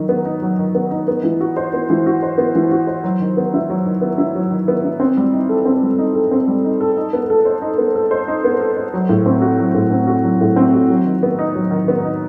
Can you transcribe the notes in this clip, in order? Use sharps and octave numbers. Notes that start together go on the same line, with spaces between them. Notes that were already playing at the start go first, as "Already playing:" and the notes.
Already playing: D#3 F#3 D#4
B3
D#4
F#3
D#3
B3
D#4
B3
E3
F#4
C5
B3
E3
F#4
C5
B3
E3
F#4
C5
F#3
D#3
B3
E4
F#3
D#3
B3
E4
F#3
D#3
B3
E4
C4
G3
D#4
A4
C4
G3
D#4
A4
C4
G3
D#4
A4
D#4
B3
A4
C5
D#4
B3
A4
C5
D#4
B3
A4
C5
F#3
A2
C4
F#4
F#3
A2
C4
F#4
F#3
A2
C4
F#4
F#3
D#3
B3
D#4
F#3
D#3
B3
D#4